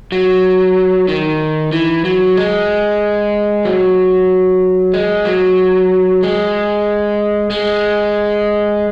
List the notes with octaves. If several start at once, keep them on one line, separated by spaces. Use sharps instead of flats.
F#3
D#3
E3
F#3
G#3
F#3
G#3
F#3
G#3
G#3